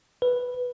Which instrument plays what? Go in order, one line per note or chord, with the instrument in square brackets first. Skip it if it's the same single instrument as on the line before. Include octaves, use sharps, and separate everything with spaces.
[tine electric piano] B4